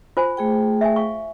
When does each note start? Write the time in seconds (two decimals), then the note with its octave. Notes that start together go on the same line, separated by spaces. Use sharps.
0.17 F4 C5 G#5
0.37 A3 G#4 G5
0.81 E5 G#5
0.96 F5 C#6